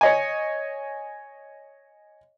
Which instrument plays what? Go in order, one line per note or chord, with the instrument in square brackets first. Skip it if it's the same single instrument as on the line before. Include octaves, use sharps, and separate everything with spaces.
[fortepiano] C#5 D#5 G#5